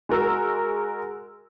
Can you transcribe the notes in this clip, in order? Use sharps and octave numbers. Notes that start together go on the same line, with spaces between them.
G#3 F#4 A#4 E6